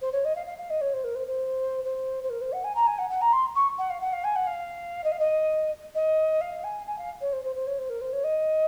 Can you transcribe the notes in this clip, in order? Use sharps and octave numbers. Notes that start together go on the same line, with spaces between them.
C5
C#5
D#5
F5
F5
F5
D#5
C#5
C5
A#4
C5
C5
C5
C5
A#4
C5
F#5
G#5
A#5
G#5
F#5
F#5
A#5
C6
C#6
F#5
F5
F#5
F5
G#5
F#5
F5
D#5
F5
D#5
D#5
F5
G#5
G#5
F5
C#5
C5
C5
C5
C#5
C5
A#4
C5
C#5
D#5